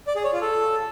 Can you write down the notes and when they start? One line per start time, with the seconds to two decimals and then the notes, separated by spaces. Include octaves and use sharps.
0.07 D5
0.16 G#4
0.24 C#5
0.33 F4
0.41 A4